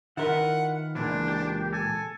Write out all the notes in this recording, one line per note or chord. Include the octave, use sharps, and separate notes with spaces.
D#3 E4 F4 A#4 B4 F#5
C#2 A#2 E3 D4
G4
A4 G#5